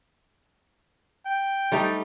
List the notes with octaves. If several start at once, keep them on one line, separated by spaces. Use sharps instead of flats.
G5
G3 A3 D#4